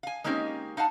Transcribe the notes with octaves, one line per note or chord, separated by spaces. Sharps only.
F5 G#5
G#3 A#3 C4 C#4 D#4 G4
D#4 F5 F#5 A5